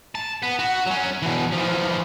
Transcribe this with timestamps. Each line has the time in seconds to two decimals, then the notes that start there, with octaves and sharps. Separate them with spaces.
0.15 A5
0.42 B3
0.59 F#4
0.87 F#3 C#4
1.23 B2 E3
1.52 E3 F3